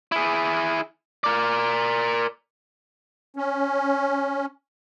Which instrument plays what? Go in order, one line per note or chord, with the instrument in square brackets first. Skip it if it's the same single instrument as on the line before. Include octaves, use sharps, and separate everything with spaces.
[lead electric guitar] E4 G#4
A#4 D5
[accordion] C#4